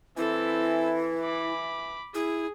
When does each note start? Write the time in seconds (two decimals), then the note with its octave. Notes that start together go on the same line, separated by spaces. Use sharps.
0.17 E3 C4 E4 A4
1.23 B5 D6
2.15 E4 G#4